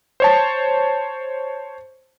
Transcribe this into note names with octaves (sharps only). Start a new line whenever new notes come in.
C5 C#5 A5